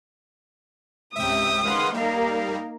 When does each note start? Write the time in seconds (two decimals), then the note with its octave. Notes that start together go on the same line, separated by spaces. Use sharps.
1.16 C#2 G#2 C3 E5 G5 D#6
1.64 D#3 G#3 B4 F5 F#5 C6
1.94 G3 A#3 D#4 A#4 F5